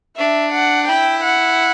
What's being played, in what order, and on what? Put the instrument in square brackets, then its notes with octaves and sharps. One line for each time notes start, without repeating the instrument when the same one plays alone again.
[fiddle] D4 [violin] E5
[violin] F#5
[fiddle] E4 [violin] G5
[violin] F#5